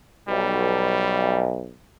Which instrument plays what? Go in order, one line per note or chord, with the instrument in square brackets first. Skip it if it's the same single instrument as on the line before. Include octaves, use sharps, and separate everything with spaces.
[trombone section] B1 [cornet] G3